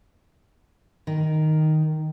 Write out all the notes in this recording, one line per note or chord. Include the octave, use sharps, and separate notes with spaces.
D#3